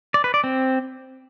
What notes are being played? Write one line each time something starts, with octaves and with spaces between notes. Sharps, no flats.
D5
B4
D5
C4